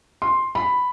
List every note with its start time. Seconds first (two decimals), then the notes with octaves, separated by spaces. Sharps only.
0.22 C6
0.55 B5